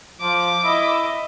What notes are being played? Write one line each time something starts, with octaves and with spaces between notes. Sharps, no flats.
F3 D6
E4 D#5 E5